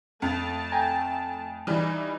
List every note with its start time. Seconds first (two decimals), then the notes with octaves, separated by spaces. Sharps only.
0.22 F2 A3 A5
0.72 G5 G#5 A#5
1.67 E3 G3 D#4